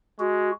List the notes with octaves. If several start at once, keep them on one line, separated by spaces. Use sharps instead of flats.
G#3 F#4